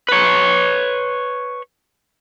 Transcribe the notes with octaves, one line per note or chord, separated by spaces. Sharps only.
B4 C#5